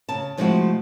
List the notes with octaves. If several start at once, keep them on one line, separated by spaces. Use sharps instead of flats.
C#3 A5
C3 F3 G#3 A3 E4 F#4